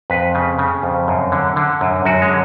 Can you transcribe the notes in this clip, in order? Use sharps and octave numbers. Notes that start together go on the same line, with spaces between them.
F2 B4
C#3
C#3
F2
F#2
D3
D3
F#2
F#2 F#4
G#3
D3